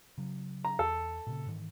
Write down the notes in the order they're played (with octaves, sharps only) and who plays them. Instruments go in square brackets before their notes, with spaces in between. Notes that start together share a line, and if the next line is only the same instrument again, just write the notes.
[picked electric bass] C#3 F#3
[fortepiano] A#5
[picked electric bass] E2 [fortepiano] A4
[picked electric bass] A#2 C#3
G#2 D#3 E3